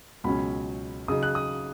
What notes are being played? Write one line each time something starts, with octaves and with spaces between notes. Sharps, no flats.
C#2 B2 F#3 C#4 B5
C#3 F#3 D#4 D#6
F#6
D#6